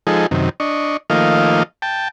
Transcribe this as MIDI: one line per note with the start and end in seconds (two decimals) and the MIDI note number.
0.07 0.26 53
0.07 0.26 56
0.07 0.26 63
0.07 0.26 68
0.07 0.26 69
0.31 0.49 42
0.31 0.49 48
0.31 0.49 51
0.60 0.97 62
0.60 0.97 75
0.60 0.97 85
1.10 1.63 51
1.10 1.63 53
1.10 1.63 57
1.10 1.63 58
1.10 1.63 75
1.10 1.63 77
1.82 2.08 79
1.82 2.08 81